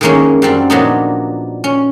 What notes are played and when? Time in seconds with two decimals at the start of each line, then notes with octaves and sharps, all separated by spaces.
0.01 D#3 E3 G#3 A#3 C#4
0.42 F#2 G3 C4 D4
0.70 A#2 F3 F#3 B3 D4 D#4
1.64 C#4